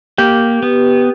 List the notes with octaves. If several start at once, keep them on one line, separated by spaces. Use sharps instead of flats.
A#3 G4
B3